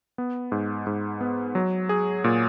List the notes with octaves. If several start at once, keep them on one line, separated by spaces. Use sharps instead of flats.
B3
G#2
G#2
B3
F#3
G#4
A#2